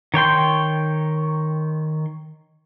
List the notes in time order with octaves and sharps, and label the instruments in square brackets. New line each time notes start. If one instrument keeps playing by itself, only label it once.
[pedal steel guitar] D#3 C#5 G5 C6